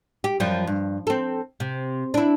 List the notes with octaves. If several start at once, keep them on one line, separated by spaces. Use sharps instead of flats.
G4
F#2 F3 G3
G2
C4 A4
C3
D4 E4